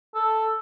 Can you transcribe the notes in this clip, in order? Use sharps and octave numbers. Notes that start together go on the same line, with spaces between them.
A4